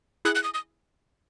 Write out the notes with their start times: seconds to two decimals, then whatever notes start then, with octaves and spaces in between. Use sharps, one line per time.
0.25 E4 G#4 F#6
0.35 F#6
0.44 D#6
0.54 D#6